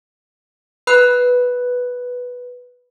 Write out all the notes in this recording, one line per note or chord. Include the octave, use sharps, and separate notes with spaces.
B4 B5 F#6